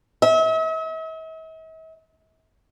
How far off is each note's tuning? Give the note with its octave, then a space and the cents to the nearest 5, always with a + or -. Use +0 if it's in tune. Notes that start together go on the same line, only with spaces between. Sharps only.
E5 -45